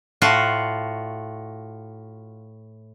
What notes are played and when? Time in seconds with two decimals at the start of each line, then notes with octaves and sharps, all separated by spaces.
0.22 A2 F4 F#4